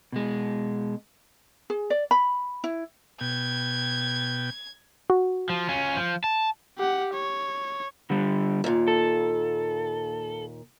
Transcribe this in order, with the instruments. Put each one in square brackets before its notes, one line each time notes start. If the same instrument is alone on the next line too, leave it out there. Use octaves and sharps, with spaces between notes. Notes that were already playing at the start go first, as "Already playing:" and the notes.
[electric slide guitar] B2 G#3
[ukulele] G#4
D5
B5
E4
[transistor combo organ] B2 G5 [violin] G#6
[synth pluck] F#4
[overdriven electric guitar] F3
C#4 F4
F3
A5
[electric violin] G4 F#5
C#5
[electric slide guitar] D3 G3
[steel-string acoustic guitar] D#2 A#2
[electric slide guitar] A4